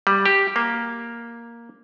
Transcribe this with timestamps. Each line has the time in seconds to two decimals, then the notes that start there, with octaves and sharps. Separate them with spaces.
0.07 G3
0.26 G4
0.56 A#3